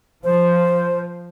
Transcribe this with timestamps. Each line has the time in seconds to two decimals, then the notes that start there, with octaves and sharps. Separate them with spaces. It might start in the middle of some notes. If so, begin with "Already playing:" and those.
0.24 F3 C5